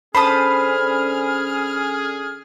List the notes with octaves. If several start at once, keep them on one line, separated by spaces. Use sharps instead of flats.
D3 C#4 G#4 C5 A5 B5 D#6 F6